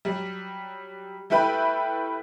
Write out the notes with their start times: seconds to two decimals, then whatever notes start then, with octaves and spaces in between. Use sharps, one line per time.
0.05 F#3 G3
1.30 G3 A3 E4 B4 G5 B5